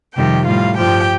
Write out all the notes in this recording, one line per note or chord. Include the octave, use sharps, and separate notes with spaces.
F2 C3 D#3 G3 G4 G5
A2 G3 F4 F5
G2 F3 G4 G5